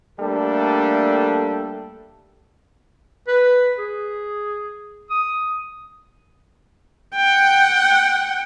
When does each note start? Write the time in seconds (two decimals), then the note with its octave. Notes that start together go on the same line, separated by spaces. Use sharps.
0.20 G3 A3 A#3 D4 A4
3.28 B4
3.79 G#4
5.11 D#6
7.15 F#5 G5